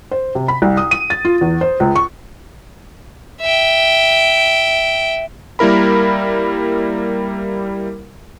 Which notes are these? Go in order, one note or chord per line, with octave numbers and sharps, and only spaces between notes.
C5
C3
B5
C2
D#6
D#7
A6
F4
E2
C5
C#2
C#6
E5 G5
G3 A#3 E4 A#4 B5